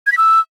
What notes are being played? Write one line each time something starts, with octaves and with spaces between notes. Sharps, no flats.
G#6
B6
E6